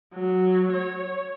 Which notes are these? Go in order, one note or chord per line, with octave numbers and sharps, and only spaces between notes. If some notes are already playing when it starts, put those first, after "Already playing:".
F#3
C#5